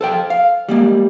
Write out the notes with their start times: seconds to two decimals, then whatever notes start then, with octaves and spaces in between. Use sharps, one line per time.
0.01 A4 C5 G5
0.30 F5
0.69 G3 G#3 A#3